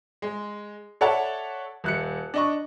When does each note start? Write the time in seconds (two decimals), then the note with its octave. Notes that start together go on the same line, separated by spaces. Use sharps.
0.22 G#3
1.01 A4 C#5 D5 E5 F#5 A5
1.84 D#1 F#6 C#7
2.34 D4 D#5 C#6